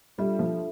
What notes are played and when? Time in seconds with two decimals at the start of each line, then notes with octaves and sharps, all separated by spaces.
0.18 G3 D4 F4 A4 E5
0.39 F3